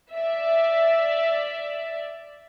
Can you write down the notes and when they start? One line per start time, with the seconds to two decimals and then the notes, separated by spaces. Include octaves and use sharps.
0.13 D5 E5